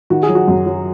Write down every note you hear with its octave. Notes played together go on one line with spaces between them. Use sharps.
D#3 F#4
G#4
F#3
F#4
F#2
F#3